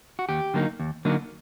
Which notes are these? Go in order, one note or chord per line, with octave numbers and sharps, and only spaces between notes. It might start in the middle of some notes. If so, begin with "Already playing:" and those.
F#4
D#2 G4
D3 F#3 A#3 D#4
D#2
D3 F#3 A#3 D#4